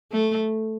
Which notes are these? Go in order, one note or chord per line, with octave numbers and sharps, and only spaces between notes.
A3